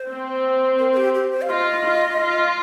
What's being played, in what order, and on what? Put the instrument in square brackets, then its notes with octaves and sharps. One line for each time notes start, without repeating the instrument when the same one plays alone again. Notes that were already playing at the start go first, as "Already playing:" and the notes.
Already playing: [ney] C5
[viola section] C4
[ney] A#4
A#4
G4
G4
C5
F5
[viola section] F4 [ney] D#5
[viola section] F4
F4